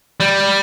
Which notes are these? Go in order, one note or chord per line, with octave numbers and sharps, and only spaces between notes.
G3